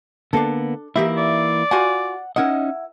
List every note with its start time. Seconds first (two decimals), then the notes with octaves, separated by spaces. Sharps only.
0.33 D3 A#3 B3 D4 A4
0.96 E3 A#3 D#4 E4 G4 E5
1.17 D5
1.71 F4 F#4 F#5 G#5
2.36 C#4 D#4 E4 A#4 D#5 F#5